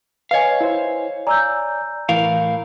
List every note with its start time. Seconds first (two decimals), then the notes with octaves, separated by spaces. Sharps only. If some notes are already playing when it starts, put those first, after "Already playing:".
0.31 B4 C#5 D#5 F5 G#5
0.61 E4 C5
1.27 D5 G#5 A#5 E6 G6
2.09 A2 E3 A#4 F5